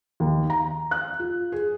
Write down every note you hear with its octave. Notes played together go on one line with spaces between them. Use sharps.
D#2
A#5
F#6
F4
G#4